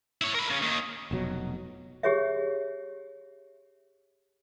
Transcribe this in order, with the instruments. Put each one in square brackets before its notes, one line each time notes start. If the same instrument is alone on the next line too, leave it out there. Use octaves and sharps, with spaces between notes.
[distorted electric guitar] E4 C#5
A#4 B5
C#3 C#4
D#2 D#3
[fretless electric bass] F1 B2 F#3
[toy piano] G4 G#4 C#5 E5